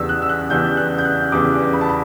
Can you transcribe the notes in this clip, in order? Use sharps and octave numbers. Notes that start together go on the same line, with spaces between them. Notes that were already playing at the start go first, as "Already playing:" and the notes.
Already playing: E2 C#3 E3 G3 D4 E6
F#6
E6
F#6
E2 C#3 E3 G3 D4 G6
F#6
G6
F#6
E2 C#3 E3 G3 D4 D6
B5
A5
B5